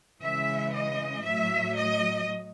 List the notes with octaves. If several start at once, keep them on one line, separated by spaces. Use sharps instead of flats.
C#3 E3 G#3 E5
D#5
A2 F#3 E5
D#5